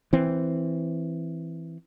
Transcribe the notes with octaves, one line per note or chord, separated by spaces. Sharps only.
E3 C4